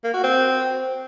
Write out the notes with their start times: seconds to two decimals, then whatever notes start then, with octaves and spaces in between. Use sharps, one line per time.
0.04 A#3
0.14 F#4
0.24 C4